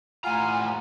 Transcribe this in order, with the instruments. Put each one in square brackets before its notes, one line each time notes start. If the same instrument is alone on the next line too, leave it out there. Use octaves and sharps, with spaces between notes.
[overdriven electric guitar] A2 A#5 [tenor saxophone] F4 [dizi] F#5 [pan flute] G#5